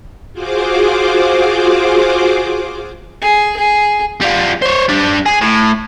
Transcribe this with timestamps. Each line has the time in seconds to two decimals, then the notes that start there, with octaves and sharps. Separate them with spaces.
0.33 F4 F#4 G#4 C5 D6
3.22 G#4
3.57 G#4
4.21 G3 F4
4.62 C5 C#5
4.89 G3 D4
5.26 G#4
5.42 A2